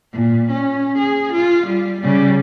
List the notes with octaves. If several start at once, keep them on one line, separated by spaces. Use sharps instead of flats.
A#2
C#4
G#4
F4
G3
C#3 G3